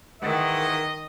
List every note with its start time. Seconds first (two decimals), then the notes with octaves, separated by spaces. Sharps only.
0.22 G#2 D#3 E3 D#5 F#5